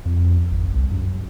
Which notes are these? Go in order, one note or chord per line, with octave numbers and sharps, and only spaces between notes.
F2
G#1
C2
F#2